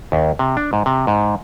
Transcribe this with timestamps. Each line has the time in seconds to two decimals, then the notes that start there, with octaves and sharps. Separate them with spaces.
0.12 D#2
0.39 C3
0.57 D4
0.73 G#2
0.86 C3
1.07 G#2